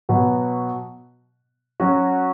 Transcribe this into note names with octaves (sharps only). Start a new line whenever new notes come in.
B2 F#3 B3 F#4
F#3 C#4 F#4